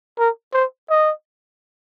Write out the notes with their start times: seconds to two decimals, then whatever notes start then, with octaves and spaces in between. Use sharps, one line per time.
0.18 A#4
0.54 C5
0.90 D#5